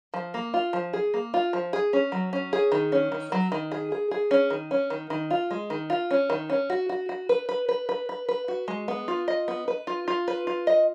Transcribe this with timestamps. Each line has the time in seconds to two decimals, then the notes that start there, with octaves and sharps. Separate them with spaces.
0.14 F3
0.34 A#3
0.54 F4
0.73 F3
0.93 G#4
1.14 A#3
1.34 F4
1.53 F3
1.73 G#4
1.93 C#4
2.12 F#3
2.33 C#4
2.53 G#4
2.72 D#3
2.92 C#4
3.12 D#3
3.32 F#3
3.52 D#3
3.72 G#4
3.92 G#4
4.11 G#4
4.31 C#4
4.50 D#3
4.71 C#4
4.90 D#3
5.10 D#3
5.31 F4
5.51 G#3
5.70 D#3
5.90 F4
6.11 C#4
6.30 D#3
6.50 C#4
6.70 F#4
6.89 F#4
7.09 F#4
7.29 B4
7.49 B4
7.69 B4
7.89 B4
8.09 B4
8.29 B4
8.48 F#4
8.68 G#3
8.88 B3
9.08 F4
9.28 D#5
9.48 B3
9.68 B4
9.87 F4
10.08 F4
10.28 B4
10.47 F4
10.67 D#5